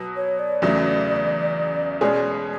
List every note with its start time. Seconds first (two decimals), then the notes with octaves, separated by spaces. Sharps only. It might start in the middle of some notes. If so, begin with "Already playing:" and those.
Already playing: B2 F#3
0.16 C#5
0.39 D5
0.62 E2 C#3 F#3 A3
2.01 B2 G#3 C#4 G#4 D5